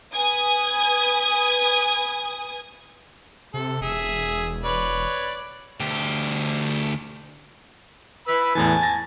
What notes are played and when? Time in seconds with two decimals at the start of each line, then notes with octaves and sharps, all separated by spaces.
0.13 B4 G#5 D#6 G#6
3.54 C3 A4
3.81 E1 G#4 E5
4.64 B4 C#5 D5
5.80 D2 G4
8.28 B4 B5 E6
8.55 E2 A2 E3 G#5 A5
8.82 A6 A#6